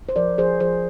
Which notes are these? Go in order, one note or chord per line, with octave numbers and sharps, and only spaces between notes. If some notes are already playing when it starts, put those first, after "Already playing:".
C5
F3 A#4 D5
F3 G#4 C5
F3 G#4 C5